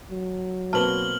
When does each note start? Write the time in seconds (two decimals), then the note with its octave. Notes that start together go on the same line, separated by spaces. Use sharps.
0.11 F#3
0.73 B2 A#3 C4 B4 A5 F6 F#7 G7